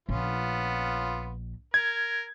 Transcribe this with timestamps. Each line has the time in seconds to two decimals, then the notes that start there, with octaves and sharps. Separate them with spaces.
0.09 A#1 B3 C#4 F4
1.74 A#4 G#6